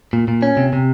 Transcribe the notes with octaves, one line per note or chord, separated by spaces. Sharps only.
A#2
A#2
C#4
C3
C3